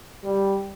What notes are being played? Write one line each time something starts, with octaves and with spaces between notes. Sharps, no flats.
G3